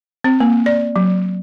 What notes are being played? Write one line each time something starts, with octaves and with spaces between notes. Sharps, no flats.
C4
A#3
D5
F#3